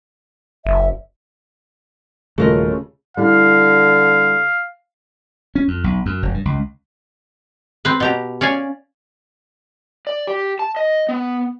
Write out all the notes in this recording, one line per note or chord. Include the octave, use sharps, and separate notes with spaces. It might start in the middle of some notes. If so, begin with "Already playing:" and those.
F#1 E5
D#1 C#3 A3 F4 F#4 A#4 D#5
D3 G3 E4 F5
C#4
F2
B1
F#2
F1
G2
C#2
C4 B4
B2 G4 A#5
C#4 D5 F5 G#5
D5
G4
A5
D#5
B3